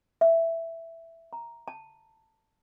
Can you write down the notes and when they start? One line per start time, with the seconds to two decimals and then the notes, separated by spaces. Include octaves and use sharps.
0.21 E5
1.33 A#5
1.68 A5